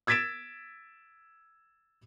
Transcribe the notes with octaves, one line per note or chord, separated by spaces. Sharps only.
E6 G#6 A6 B6 D7 E7